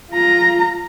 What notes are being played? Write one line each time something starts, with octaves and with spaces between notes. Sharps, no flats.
F4 A#5